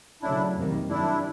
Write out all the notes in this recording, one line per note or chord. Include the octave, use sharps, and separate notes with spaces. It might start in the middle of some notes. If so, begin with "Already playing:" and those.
C#3 F#3 A3 C#4 D4 E4
F2 C3 D#3 G3 A#3
F#2 D#3 G3 D4 E4